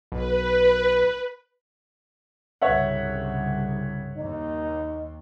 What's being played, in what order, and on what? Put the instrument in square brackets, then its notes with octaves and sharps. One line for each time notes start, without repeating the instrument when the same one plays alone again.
[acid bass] B1 [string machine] B4
[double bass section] C2 G2 C#3 [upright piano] C#5 E5 F#5
[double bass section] D#2 [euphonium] D#4